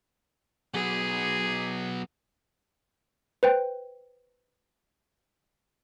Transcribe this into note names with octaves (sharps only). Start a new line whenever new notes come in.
F#3 B3 G#4
B4 C5 G5